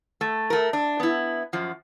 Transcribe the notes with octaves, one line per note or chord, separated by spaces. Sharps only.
A3
A3 A#4
D4
B3 E4
F#2 F3